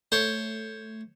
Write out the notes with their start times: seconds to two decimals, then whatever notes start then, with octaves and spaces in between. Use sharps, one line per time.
0.12 A3 C5 C#5